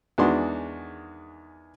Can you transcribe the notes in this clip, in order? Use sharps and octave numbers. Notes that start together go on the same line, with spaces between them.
E2 D#3 G#3 D4 F#4 C6